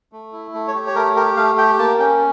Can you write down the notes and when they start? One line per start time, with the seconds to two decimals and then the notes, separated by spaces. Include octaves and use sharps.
0.13 A3
0.33 E4
0.54 A3
0.68 C#5
0.74 G4
0.87 C#5
0.95 A3 A#4
1.16 G4 A#4
1.37 A3 F5
1.58 G4 G5
1.79 A#3 A5
1.99 C#4 G5